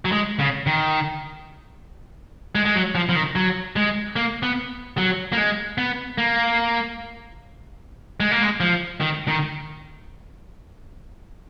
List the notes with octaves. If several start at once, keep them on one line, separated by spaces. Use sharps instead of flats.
F#3
G#3
C#3
D#3
G#3
G#3
F#3
F3
F3
D#3
F#3
G#3
A#3
B3
F#3
A#3
G#3
B3
A#3
G#3
A#3
G#3
F3
D#3
D#3